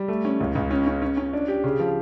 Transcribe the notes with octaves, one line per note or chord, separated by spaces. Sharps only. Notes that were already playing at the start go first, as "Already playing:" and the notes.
Already playing: G3
A3
C#4
C#2
C#2
C#4
C#4
C#4
C#4
D4
G4
C#3
F3